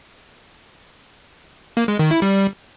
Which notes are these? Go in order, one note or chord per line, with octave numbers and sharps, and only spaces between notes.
A#3
G#3
D#3
E4
G3